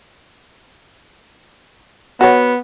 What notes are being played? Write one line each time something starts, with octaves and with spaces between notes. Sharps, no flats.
B3 F#4 C#5